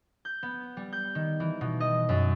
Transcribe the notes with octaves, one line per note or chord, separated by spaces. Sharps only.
G6
B3
G3
G6
D#3
E3
B2
D#5
F#2